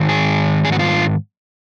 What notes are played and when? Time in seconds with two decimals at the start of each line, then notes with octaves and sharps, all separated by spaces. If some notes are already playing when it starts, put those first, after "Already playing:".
Already playing: G#2 D#3
0.09 G#4
0.65 G#4
0.72 F#4
0.79 F4